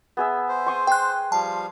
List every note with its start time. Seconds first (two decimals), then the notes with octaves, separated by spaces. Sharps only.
0.17 B3 G#4 E5
0.49 C5
0.66 C6 C#6 D#6
0.87 G5 C6 F#6
1.32 F3 G3 F5 A5